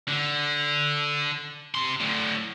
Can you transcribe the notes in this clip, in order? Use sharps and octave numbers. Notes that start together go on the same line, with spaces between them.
D3
C3 C6
A2 D3